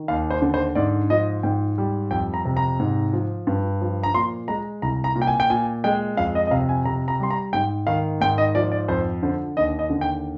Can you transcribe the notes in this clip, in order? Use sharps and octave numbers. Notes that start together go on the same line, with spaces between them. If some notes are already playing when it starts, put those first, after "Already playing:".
Already playing: D#3
D#2 F5
C5
D3
C5
G#2 D5
F3 D#5
G#2 G5
G3
F2 G5
A#5
C3
A#5
G#2
F3
G2
F3
A#5
A#2 C6
G#3 A#5
C2 A#5
A#5
A#2
G5
G#5
G5
A#2 G#5
G#3 G5
F2 F5
D#5
D#5
C3 F5
G#5
C3 A#5
A#5
G3 C6
A#5
G#2 G5
D#3 F5
G#2 G5
D#5
F3 D5
D5
F2 C5
D3 C5
D#2 D#5
D#5
D3
G5